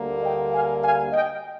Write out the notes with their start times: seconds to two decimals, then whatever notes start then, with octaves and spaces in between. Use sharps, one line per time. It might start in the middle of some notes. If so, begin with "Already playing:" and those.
Already playing: D2 D3 G3 A#3
0.23 D#5 G5
0.52 F5 G#5
0.82 F5 G#5
1.12 D#5 G5